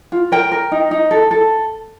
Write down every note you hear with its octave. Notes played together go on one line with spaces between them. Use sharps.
F4
A#4 G5
A#4
D#4
D#4
A4
A4